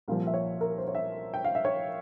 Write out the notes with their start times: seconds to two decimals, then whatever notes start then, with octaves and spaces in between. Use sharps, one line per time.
0.08 C2 A#2 F3 F5
0.27 E5
0.34 C#5
0.61 A#4
0.78 C5
0.88 C#5
0.95 E5
1.34 G5
1.45 F5
1.55 E5
1.65 C#5